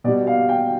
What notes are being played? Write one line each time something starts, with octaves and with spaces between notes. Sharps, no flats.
B2 G3 D5
F5
G5